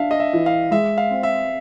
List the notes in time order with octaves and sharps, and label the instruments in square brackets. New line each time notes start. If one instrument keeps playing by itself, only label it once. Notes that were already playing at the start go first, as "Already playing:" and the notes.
Already playing: [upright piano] D4 [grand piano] E5 F5
[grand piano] D#5
E5
[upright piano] E3
[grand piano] F5
[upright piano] G#3 [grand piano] E5
[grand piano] F5
[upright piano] C4
[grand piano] E5